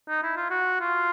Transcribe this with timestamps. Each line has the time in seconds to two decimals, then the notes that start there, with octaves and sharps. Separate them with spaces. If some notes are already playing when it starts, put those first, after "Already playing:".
0.09 D#4
0.23 E4
0.37 F4
0.50 F#4
0.80 F4